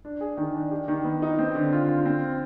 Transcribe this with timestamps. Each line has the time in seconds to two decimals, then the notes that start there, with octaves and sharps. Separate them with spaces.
0.05 D4
0.21 G#4
0.37 D#3
0.55 D4
0.71 G4
0.88 D#3
1.04 B3
1.22 D#4
1.39 C4
1.55 D3
1.73 F4
1.89 F4
2.06 C4